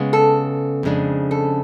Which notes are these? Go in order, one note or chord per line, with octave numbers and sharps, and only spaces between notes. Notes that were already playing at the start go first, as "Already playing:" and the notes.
Already playing: C#3 G#3 B3
A4
F2 C#3 G#3 D4
A4